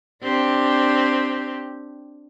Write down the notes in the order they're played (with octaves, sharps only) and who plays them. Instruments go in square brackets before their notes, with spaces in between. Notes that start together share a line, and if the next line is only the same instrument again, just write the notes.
[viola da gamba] C4 D4 G4